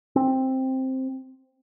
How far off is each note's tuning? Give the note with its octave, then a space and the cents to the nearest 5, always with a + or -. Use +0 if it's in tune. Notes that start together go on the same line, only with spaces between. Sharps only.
C4 +5